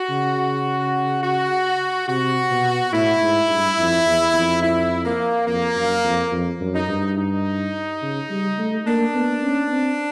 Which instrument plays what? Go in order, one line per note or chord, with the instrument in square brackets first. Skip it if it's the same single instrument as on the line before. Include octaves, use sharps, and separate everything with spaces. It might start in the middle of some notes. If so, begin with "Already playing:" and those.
Already playing: [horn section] F#4
[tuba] C#3
[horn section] F#4
[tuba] C3 [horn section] F#4
[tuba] B2
[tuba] A2 [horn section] E4
[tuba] G#2
G2
F2
E2
F2
[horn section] E4
A#3
[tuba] F2 [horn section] A#3
[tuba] F#2
F2
F2
F#2
[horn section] D#4
[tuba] G2
[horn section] D#4
[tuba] C#3
G3
A3
[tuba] A#3 [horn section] D4
[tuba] B3
C#4
C4